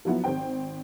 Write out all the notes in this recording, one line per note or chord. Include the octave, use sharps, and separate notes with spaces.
F3 F#3 B3 E4
G#1 C5 G5